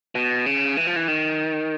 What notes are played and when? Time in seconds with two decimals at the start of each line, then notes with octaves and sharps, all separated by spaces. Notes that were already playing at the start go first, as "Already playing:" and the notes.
0.15 B2
0.46 C#3
0.77 E3
0.87 F3
0.96 E3
1.08 D#3